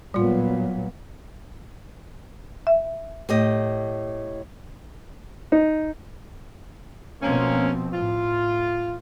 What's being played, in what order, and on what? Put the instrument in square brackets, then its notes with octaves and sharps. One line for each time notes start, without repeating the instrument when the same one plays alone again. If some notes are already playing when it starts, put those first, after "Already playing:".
[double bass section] A#2 F#3 B3 [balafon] G3 F4
[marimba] E5
[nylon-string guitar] A2 G4 D#5
[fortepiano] D#4
[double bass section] B2 F3 C4 [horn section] A#3 C#4
[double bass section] A2 [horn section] F4